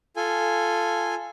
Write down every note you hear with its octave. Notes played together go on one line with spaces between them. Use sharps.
F4 A4 G#5